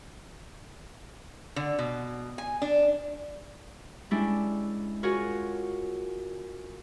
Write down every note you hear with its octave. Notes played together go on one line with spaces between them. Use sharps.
D3
B2
G#5
D4
G3 G#3 C#4 D4 E4
F4 F#4 G#4 A#4 C#5